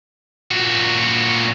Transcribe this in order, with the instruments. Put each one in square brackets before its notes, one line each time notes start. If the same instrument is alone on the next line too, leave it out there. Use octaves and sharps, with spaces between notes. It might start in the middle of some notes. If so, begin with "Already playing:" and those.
[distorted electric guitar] A#2 F#4